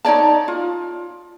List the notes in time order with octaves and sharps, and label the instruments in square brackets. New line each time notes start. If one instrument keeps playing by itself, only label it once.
[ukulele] D#4 C#5 D5 A5
F4